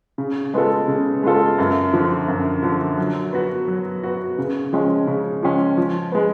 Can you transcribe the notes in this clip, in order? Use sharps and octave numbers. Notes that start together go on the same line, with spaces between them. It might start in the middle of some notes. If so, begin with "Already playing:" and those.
C#3
G#3 B3 F4 A4
C#3
G#3 B3 F4 A4
F#2
D3 F3
F#2
D3 F3
F#3
B3 F#4
F#3
B3 F#4
C#3
F3 G#3 C#4
C#3
F3 G#3 C#4
F3
G#3 B3